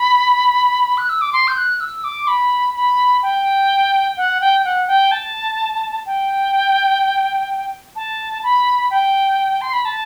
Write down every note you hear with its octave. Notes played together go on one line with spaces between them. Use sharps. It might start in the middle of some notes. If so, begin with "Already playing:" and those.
Already playing: B5
F#6
E6
D6
C6
G6
F#6
E6
D6
B5
B5
G5
F#5
G5
F#5
G5
A5
G5
A5
B5
G5
C6
B5
A5